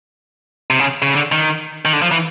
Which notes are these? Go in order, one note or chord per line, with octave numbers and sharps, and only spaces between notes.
C3
C#3
C#3
D3
D#3
D#3
D3
F3
E3